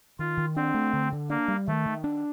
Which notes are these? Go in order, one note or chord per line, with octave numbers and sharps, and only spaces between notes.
D#3 F4
D#3
C4 D4
A3
D3
D3
A#3 D4
G3
D#3 A3
D#3
D4